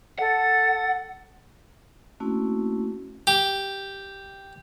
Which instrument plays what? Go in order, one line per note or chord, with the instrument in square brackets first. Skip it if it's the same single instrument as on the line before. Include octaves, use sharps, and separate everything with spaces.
[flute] A4 [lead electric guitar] F#5
[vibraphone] A3 A#3 C4 C#4 E4 F#4
[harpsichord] G4